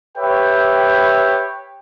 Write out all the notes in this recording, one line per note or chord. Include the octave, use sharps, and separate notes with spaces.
G4 B4 C#5 E5 G5